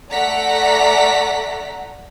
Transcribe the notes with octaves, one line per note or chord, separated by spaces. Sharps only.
A3 D5 F#5 A#5 B6